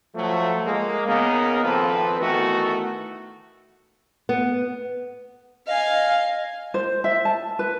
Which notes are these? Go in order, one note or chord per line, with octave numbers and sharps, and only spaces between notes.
F3 F#3 A3
G#3 A#3
C#3 A#3 B3 D#4 G#4 A#4
G#1 F3 C4 A4 B4
D#3 E3 A3 B3 F#4
B3
D#5 F5 G#5
C5
E5
A5
B4